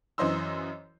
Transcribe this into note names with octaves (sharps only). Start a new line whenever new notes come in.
F#2 E3 C5 D#5 C6 E6